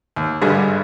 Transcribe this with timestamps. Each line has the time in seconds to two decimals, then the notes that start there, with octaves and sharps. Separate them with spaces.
0.16 D#2
0.41 G#1 G2 D3 G3 G#4